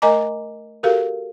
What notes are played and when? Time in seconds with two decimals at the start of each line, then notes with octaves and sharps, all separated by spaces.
0.02 A3 A#4 D#5 G#5 A#5 D6
0.83 F#4 G4 A4 A#4 F5